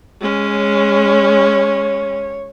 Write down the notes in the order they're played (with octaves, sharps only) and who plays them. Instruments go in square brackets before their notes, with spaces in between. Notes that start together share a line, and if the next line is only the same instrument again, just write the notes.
[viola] G#3 C#4
[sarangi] C#5